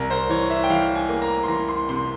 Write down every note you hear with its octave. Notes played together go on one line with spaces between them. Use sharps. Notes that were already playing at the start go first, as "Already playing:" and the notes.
Already playing: C2 A#4
C5
E3 C#5
E5
G5
E3 F5
G#5
A#3
A#5
C6
E3 A#5
C6
C3 C6